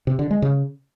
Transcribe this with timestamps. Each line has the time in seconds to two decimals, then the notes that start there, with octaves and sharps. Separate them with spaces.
0.07 C3
0.19 D3
0.31 G#3
0.42 C#3